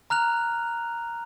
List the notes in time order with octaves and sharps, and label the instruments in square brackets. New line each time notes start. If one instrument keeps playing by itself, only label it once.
[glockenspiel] A#5 F6 F#6 F7